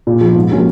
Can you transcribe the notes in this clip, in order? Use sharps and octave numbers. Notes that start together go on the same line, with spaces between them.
A#2
F3 B3
G#2
F3 A#3 C#4 F#4